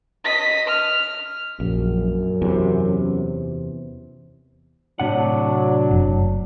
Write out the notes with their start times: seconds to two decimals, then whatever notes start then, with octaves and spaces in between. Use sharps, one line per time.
0.25 D#5 B6
0.67 F6
1.60 A#1 F#2
2.42 E2 C3
5.00 A2 C3 F#3 D4 F#5
5.91 F#1 F#2